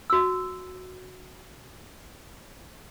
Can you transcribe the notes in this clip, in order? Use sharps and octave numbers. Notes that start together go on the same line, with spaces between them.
F#4 E6